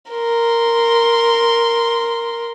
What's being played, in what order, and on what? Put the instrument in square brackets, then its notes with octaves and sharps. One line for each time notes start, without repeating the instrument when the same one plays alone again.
[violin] A#4 C6